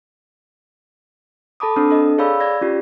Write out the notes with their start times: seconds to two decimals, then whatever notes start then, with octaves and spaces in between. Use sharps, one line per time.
1.60 A4 A5 B5 D6 D#6
1.76 C4 D4 A4 D#6
1.91 A4 D#5
2.18 G#4 C#5 D5 F5 B5 E6
2.40 D5 G#6 A#6
2.61 C#4 F4 G4